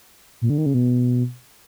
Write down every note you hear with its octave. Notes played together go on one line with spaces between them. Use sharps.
A#2
D3
D#3
C#3
B2